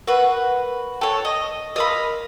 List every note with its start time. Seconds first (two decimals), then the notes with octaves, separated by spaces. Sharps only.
0.07 F#4 A#4 B4 F#5
1.01 A4 C#5 G5
1.25 D#5
1.76 G#4 A#4 D#5 F5 B5 C6